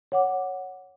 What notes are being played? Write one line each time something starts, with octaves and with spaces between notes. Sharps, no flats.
C#5 F#5 D6